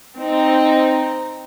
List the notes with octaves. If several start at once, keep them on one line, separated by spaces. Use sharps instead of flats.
C4 D#4